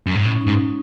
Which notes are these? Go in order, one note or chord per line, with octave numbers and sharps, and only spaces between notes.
F#2
G#2
A2 C#4
D#4
G#2
C#4